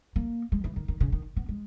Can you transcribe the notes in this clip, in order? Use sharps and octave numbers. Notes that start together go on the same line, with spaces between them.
A#3
G#3
E3
D#3
D#3
C#3
D#3
B3
G#3